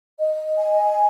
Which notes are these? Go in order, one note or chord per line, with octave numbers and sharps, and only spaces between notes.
D#5
G#5